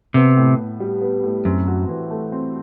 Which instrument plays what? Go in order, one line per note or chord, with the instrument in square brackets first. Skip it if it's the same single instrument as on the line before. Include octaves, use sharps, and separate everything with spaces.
[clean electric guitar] C3 [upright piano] B3
[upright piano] A2
A2
G3
B3
A2
[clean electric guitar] F#2 [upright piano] C4
[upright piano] F#4
E3
A3
C4